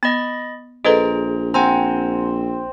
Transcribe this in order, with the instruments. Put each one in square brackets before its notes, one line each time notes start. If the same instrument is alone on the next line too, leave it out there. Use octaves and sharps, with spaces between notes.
[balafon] B3 [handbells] D#5 B5 A6
[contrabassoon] A#1 [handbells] G#4 C5 A#5 [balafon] A4 B4 D#5
[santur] C4 [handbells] F#5 G#5 A#5